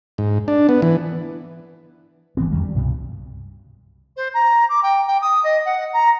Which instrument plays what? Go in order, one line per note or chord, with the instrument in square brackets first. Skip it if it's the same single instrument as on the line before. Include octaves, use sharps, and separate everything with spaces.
[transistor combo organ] G#2
D4
B3
E3
[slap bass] G1 E3 B3 C4
F2 D#3 G3 G#3
G3
C2 G2 B2
[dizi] C5
A#5
D6
G5
G5
D#6
D#5
F#5
A#5